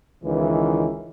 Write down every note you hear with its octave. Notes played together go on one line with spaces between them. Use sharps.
C#2 D#3 E3